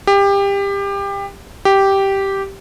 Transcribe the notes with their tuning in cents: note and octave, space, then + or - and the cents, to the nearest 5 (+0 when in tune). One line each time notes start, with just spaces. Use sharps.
G4 +25
G4 -5